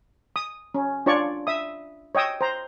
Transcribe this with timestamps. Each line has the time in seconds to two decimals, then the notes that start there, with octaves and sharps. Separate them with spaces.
0.36 D#6
0.74 C#4
1.06 D4 F4 C#5 D5 C#6
1.47 E5 D#6
2.15 C#5 D#5 G5 D#6 E6
2.41 C5 A#5